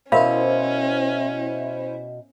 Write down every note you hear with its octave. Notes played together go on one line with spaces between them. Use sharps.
B2 C#4 E4 A#4 C5 E5 F5 B5